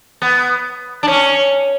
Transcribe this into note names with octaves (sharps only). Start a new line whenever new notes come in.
B3
D4
C#4